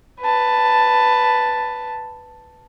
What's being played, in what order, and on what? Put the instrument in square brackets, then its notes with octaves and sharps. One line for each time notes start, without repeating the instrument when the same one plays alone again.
[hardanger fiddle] B4 A5